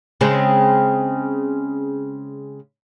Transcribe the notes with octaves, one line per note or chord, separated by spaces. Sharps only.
C#3 G#3 C4